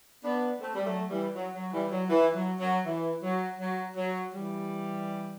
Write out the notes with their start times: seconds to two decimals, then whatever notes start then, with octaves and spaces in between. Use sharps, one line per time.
0.24 B3 D4
0.61 A3 C4
0.75 G3
0.85 F#3 A3
1.11 E3 G3
1.35 F#3
1.55 F#3
1.73 E3 G3
1.91 F#3
2.10 E3
2.35 F#3
2.60 F#3
2.85 E3
3.22 F#3
3.59 F#3
3.97 F#3
4.34 E3 G3